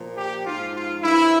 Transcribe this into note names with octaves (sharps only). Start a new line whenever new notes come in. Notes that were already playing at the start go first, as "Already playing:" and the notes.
Already playing: A#2 F3
G4
G#2 F3 F4
F4
G2 F3 E4